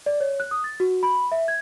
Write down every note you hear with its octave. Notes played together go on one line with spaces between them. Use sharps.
D5
C#5
F#6
D#6
A6
F#4
B5
E5
G#6